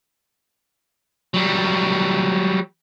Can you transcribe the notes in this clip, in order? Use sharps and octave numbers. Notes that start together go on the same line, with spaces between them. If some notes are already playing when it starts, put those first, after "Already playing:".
F#3 G3